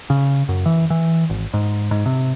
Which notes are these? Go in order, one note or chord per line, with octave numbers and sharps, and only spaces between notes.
C#3
F#2
E3
E3
G#1
G#2
G#2
C3